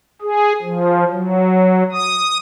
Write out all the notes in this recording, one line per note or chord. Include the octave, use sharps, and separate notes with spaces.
G#4
F3
F#3
D#6